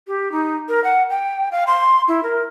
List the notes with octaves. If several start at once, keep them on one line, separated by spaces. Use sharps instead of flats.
G4
D#4
A#4
F#5
G5
F5
C6
E4
A#4